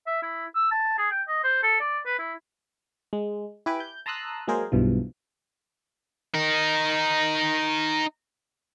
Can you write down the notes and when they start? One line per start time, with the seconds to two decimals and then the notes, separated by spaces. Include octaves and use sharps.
0.07 E5
0.22 E4
0.55 E6
0.72 A5
0.98 G#4
1.11 G5
1.28 D#5
1.44 C5
1.63 A4
1.81 D5
2.06 B4
2.19 E4
3.13 G#3
3.66 E4 G4 B4 G#5 B5 D6
3.80 G6
4.06 A5 A#5 C6 D#6 E6 F#6
4.48 F#3 G#3 A#3 G#4 A#4 C5
4.72 B1 G2 B2 E3 F3
6.35 D#4 A#4